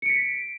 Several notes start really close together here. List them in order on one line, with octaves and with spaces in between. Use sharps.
C#7 D7 B6